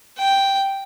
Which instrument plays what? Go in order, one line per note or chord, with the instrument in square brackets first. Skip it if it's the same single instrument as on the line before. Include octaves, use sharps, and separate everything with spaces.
[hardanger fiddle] G5